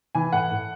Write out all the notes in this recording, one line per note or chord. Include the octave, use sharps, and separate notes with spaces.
E3 G#5
A2 F#5
A2